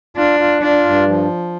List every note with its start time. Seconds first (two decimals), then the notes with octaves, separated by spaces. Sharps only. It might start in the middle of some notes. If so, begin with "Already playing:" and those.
0.17 D4 F4
0.40 F4
0.62 D4 F4
0.85 G2
1.07 F3